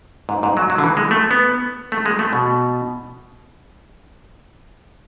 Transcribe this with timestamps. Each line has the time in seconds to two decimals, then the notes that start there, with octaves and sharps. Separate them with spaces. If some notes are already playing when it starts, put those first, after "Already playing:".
0.29 G#2
0.43 G#2
0.57 F#3
0.70 F#3
0.78 D3
0.84 E3
0.97 G#3
1.11 A3
1.31 B3
1.92 A3
2.06 G#3
2.19 A3
2.33 B2